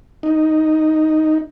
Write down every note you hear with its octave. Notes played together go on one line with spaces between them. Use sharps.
D#4